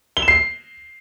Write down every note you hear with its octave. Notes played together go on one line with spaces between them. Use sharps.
G7
E7
C7